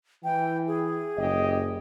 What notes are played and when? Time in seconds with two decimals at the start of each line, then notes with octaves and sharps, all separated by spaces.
0.24 E3 G5
0.67 G#4
1.18 F#1 C#3 G4 D#5